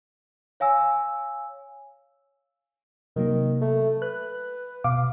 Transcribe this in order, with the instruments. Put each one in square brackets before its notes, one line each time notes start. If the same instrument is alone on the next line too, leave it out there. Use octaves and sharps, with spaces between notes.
[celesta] C#5 F5 G#5 E6
[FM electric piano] C3 F#3 A#3 [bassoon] D#3
[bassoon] A3
[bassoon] B4 [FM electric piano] F#6
[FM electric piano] B2 F5 D6